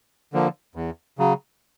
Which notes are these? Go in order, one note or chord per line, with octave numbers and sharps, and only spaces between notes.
D3 F3 A#3
E2
C#3 F#3